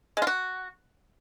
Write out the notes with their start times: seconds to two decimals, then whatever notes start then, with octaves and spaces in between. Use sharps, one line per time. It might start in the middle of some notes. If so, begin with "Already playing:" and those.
0.17 G#3
0.22 F4
0.27 F#4